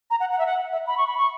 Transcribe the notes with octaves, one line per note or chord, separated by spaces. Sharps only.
A#5
F#5
F#5
E5
F#5
E5
B5
C#6
B5
C#6